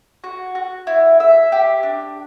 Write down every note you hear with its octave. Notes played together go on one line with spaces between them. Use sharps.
F#4
F#4
E4
E5
G4
D4